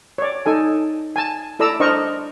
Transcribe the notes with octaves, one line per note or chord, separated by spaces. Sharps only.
C#5 D5
D#4 A4 G#5
G#5 A5
E4 A4 D5 A#5 E6
D4 A#4 C5 D#5 C#6